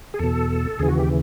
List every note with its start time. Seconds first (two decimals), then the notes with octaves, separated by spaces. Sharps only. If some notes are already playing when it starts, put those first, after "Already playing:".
0.14 G#4
0.19 E2 B2 A4
0.79 D#2 C#3 E3 G#4
0.88 F#4
0.98 G4